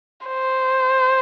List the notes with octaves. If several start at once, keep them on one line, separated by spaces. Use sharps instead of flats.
C5